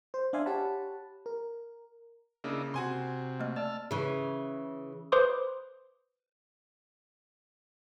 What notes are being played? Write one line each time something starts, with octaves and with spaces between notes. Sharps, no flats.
C5
D4 D5 E5 F5 G#5 C6
G4 C#5 F#5 A5 B5
A#4
C#3 A#3 D4 E4 D#5
C3 F#4 G#5 C6
A3 A#3 D#5
A3 D5 A5 E6 F6
C#3 E3
B4 C5 C6 D6 D#6